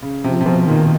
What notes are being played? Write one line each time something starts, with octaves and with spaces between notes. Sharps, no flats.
C#3
C3 F3
C3
B2 F3
A#2 D#3